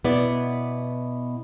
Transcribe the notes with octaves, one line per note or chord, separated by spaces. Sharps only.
B2 B3 E4 D5